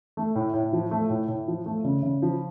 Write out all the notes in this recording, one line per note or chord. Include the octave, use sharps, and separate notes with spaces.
A3
A2
A2
F3
A3
A2
A2
F3
A3
C#3
C#3
F3